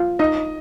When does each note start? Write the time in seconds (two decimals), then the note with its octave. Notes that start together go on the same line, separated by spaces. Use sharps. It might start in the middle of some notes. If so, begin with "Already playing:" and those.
Already playing: F4
0.19 D#4 D#5